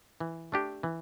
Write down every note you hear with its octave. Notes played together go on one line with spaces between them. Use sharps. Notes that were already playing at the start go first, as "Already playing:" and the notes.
E3
A3 D4 G4
E3